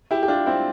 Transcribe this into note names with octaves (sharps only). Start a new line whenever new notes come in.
E4 G4
G4
D4 F4
C4 E4